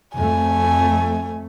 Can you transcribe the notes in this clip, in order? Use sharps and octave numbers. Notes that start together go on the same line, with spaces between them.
F2 A3 G#5